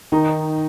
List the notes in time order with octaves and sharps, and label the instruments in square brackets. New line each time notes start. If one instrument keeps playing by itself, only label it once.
[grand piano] D#3 [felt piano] D#4